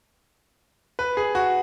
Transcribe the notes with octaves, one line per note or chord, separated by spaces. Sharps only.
B4
G#4
F#4